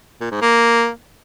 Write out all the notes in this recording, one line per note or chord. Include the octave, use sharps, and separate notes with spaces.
A#2
G#2
A#3